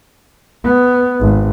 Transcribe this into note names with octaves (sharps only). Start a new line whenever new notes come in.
B3
G#1